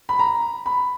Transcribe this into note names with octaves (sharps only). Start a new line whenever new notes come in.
B5
A#5
B5